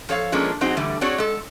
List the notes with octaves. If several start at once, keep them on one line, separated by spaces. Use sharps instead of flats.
F3 A4 C#5 F5
F3 G#3 A#3 C#4 D4
F#3 C4 D#4 F#4 G#4 C5
D3 E3 G3 A3
C4 D4 F#4 G#4 C#5 D5
G#3 A4